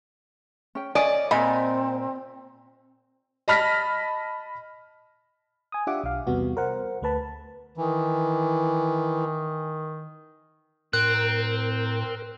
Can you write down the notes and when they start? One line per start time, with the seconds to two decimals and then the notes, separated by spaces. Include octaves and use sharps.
0.75 C#4 G5
0.95 C#4 D5 D#5 G#5
1.31 A#2 C4 D5 D#5 G#5 B5
3.48 D#5 A5 B5 F6 A#6 B6
5.72 G#5 D#6
5.87 D4 F4 G4 E5 F#5 D6
6.04 B1 F5
6.27 E2 C3 G3 B3 F#4
6.57 A#4 C5 F#5
7.02 D2 A3 B4 A5 B5
7.77 D#3 E3
10.93 A2 C4 A#4 F#6